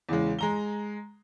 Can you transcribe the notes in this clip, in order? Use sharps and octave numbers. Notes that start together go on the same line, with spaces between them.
E2 C#3 G#3
G#3 A#5 G7